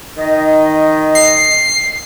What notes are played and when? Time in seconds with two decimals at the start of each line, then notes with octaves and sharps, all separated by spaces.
0.17 D#3 D#5
1.15 C7